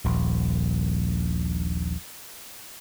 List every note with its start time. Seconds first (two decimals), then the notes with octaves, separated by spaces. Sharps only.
0.05 D#1 A#1